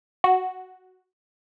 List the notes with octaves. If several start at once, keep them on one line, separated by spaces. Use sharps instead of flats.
F#4